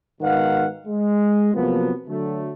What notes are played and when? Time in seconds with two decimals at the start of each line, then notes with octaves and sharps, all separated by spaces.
0.21 G#2 B2 D#3 B4 F5 F#5
0.86 G#3
1.54 C3 F3 F#3 A#3 B3
2.08 D3 F#3 A3